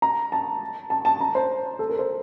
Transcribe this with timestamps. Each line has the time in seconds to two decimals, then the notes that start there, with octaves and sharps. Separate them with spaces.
0.02 A#5
0.32 A5
0.90 A5
1.05 A5
1.21 A#5
1.35 C5
1.79 A4
1.89 A#4
1.99 C5